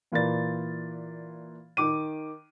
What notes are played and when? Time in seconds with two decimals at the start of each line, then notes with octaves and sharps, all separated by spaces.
0.12 A#2 E3 F4 A#4 D5 A6
1.77 D#3 D6 D#7